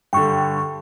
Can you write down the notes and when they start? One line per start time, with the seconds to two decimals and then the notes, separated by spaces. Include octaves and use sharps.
0.13 G2 D3 G5 C#6